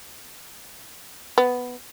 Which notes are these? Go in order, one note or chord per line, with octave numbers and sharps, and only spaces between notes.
B3